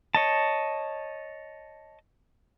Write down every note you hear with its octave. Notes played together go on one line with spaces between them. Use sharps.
C#5 D#5 A5